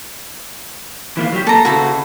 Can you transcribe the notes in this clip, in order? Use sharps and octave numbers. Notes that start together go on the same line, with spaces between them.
E3 A#3 F4
F#3 G4
A#3 A4 A#5
C#3 E4 F#4 A4 A#5